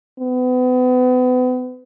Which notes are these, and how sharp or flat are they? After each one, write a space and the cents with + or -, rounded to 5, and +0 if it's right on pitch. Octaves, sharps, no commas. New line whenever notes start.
B3 +35